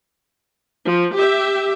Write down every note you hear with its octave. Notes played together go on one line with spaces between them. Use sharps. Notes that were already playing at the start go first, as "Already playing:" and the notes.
F3
G4 E5